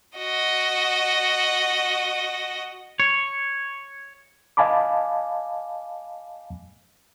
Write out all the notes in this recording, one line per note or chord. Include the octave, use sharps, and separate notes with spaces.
F#4 D#5
C#5
D#5 F5 G#5 A5 B5 D6